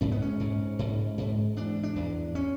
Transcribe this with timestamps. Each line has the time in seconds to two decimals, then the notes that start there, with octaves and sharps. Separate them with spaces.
0.01 G#2 C#4
0.12 B3
0.22 C#4
0.40 G#2
0.79 G#2
1.18 G#2
1.56 E2 D4
1.83 D4
1.96 E2
2.35 C#4